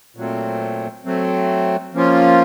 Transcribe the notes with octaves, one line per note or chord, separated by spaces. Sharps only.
A#2 F#3 A3 C4
F#3 A3 C4
F3 A#3 C#4 F4